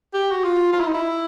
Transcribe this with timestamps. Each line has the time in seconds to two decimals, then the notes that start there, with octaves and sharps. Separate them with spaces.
0.14 G4
0.31 F#4
0.44 F4
0.73 F4
0.80 E4
0.87 D#4
0.94 E4